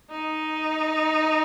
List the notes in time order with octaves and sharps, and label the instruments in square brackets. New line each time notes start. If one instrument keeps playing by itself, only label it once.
[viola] D#4